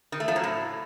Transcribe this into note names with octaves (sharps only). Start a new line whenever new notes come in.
D#3
A3
F3
F#3
A2